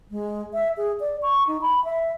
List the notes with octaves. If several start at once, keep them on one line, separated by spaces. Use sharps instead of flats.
G#3
E5
G#4
D5
C#6
D#4
B5
E5